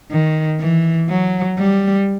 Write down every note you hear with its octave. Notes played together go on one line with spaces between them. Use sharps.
D#3
E3
F#3
G3